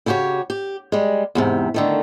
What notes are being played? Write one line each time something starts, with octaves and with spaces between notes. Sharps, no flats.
C#3 E4 F#4 G4 C#5
G4
G3 G#3
E2 G#2 C3
D3 D#3 A3